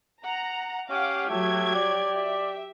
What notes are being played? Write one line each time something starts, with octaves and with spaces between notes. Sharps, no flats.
F#5 A#5
C#4 G4 F5 F#5 D6
F#3 A3 G#6
D5
E5